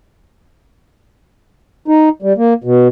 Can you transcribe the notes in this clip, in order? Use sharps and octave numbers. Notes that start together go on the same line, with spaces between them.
D#4
G3
A#3
B2